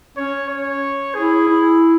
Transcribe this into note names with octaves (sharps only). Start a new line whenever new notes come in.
C#4 C#5
C#5
E4 G#4
E4